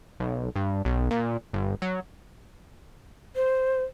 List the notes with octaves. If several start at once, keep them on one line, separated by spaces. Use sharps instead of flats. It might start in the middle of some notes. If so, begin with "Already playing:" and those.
B1
G2
B1
A#2
G1
F#3
C5